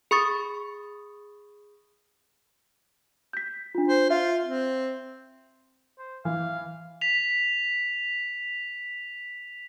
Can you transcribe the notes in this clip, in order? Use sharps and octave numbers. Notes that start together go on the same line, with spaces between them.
G#4 B5 C#6 D#6 A6
G6 B6
D4 F4
C5
F4 E5
C4
C5
E3 F5
B6 F7